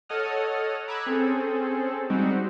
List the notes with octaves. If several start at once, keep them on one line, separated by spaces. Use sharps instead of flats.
A4 C#5 D#5 F#5 D#6 F6
A#5 B5 D6 E6 F#6 G#6
C4 C#4 G#4 A4
G3 G#3 C4 D#4 F#4 G4